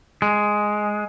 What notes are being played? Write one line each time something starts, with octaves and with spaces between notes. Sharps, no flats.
G#3